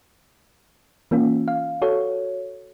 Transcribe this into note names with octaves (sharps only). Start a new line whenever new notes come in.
E3 A#3 C#4 F4
F5
F#4 A4 C#5